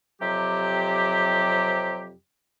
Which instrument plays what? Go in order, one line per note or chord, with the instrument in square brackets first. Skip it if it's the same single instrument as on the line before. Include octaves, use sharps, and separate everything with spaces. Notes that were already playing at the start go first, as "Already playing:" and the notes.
[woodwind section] F2 C3 F#3 G4